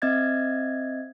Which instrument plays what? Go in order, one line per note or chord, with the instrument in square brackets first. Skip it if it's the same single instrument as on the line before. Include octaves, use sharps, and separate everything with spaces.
[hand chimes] C4 D#5 E5 G#6 A6